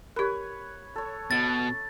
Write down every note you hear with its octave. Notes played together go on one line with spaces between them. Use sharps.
G4 A#4 B4 C#5
A4 C#5
B2 A6